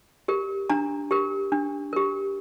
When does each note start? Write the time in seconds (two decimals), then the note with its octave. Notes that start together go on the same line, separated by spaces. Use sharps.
0.28 G4 A#4
0.70 D4 A#5
1.11 G4 A#4
1.52 D4
1.93 G4 A#4